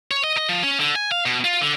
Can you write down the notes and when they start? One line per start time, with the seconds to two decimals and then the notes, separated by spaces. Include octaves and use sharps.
0.11 C#5
0.24 D#5
0.37 D#5
0.49 F3
0.64 C#4
0.80 D3
0.95 G#5
1.12 F5
1.26 B2
1.45 F4
1.61 D3